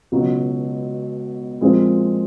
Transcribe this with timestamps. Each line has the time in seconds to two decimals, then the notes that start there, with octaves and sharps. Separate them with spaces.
0.12 C#2 B2 F#3
1.61 A#2 F3 G#3 C4 F4